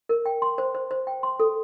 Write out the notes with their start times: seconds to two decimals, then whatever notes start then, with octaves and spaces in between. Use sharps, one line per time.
0.09 A#4
0.26 G5
0.42 C6
0.58 C5
0.75 C5
0.91 C5
1.07 G5
1.23 C6
1.40 A4